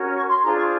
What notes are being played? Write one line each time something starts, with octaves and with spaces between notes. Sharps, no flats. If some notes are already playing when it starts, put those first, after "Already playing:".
Already playing: C#4 F#4 A#4
C#6
C6
D4 F4 G#4 C5 A#5
C#6